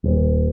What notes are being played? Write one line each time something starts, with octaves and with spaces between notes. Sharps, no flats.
D#1